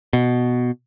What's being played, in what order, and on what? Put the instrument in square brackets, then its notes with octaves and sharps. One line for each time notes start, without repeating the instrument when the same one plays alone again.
[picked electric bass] B2